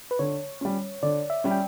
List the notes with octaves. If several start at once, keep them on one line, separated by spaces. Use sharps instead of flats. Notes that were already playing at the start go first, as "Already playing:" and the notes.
B4
D3 C#5
G3 C#4
D3 D5
E5
G3 C#4
G5